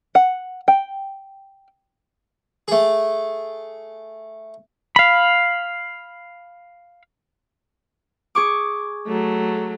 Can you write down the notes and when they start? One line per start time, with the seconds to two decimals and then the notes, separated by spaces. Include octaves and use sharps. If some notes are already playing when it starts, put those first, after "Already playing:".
0.15 F#5
0.68 G5
2.68 A3 G#4
4.96 F5 B5
8.35 G#4 C#6 D6
9.07 F#3 A3